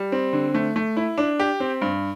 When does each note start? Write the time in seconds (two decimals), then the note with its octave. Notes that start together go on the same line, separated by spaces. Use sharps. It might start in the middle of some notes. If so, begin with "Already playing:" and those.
Already playing: G3
0.12 C4
0.33 D3
0.55 A3
0.76 A3
0.97 E4
1.18 D4
1.39 G4
1.60 C4
1.82 G2